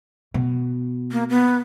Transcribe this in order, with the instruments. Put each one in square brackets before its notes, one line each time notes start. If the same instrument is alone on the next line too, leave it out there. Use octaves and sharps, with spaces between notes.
[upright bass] B2
[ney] A#3
B3